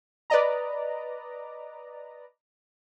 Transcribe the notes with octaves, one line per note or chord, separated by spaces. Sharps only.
B4 D5 D#5 A#5